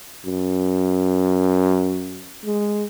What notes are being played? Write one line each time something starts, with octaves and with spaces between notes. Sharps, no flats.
F#2
G#3